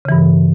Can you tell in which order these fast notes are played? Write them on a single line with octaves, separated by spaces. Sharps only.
C#3 E3 G2